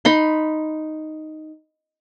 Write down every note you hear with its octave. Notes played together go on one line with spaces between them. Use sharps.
D#4 B5 C6